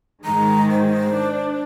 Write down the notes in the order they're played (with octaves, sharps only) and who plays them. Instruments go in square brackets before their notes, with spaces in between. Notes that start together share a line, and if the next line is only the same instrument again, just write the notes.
[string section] G#2 D#3 G#3 [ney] A#5
[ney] C5
[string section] D4